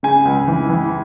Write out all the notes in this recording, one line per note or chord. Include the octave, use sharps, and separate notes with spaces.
C#3 G#5
C#2
E3
E3